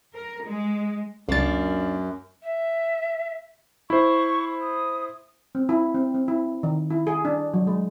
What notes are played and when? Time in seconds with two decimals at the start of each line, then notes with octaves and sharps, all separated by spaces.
0.15 A#4
0.45 G#3
1.29 C#2 F#2 A#3 D4 A6
2.43 E5
3.90 E4 C5 C#6
4.61 D#6
5.55 C4
5.69 E4
5.95 C4
6.14 C4
6.28 E4
6.63 D#3
6.90 E4
7.07 G#4
7.25 D4
7.54 F#3
7.67 G#3